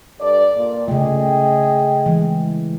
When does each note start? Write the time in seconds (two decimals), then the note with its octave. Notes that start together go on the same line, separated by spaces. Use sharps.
0.20 G2 A4 D5
0.56 A#2
0.88 C#3 A3 G#4 D#5 G5
2.06 E3 G#3